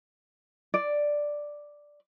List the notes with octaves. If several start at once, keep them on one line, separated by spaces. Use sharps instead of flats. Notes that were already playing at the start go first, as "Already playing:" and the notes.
D5